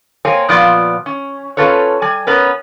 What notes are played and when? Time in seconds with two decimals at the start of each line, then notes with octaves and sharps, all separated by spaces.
0.25 A#3 C4 C#5 G#5
0.49 A#2 F3 B3 F4 D5
1.06 C#4
1.57 C#4 D#4 F4 A4 B4 C#5
2.02 G3 G#5
2.27 B3 C#4 A#4 B4